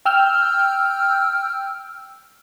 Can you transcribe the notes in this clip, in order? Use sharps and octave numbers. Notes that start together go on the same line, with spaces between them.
G5 E6 F6 G6